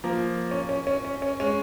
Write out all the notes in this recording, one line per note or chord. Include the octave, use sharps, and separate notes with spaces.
F3 A#3
C#4
C#4
C#4
C#4
C#4
G#3 C#4